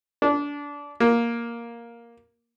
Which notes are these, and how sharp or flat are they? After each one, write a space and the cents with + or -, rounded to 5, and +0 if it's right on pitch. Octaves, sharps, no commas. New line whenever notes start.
D4 -25
A#3 +5